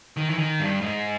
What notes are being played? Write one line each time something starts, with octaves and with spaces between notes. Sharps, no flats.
D#3
E3
D#3
G2
G#2